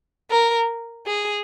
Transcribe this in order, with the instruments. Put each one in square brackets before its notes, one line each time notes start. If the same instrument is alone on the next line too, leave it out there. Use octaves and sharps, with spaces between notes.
[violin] A#4
G#4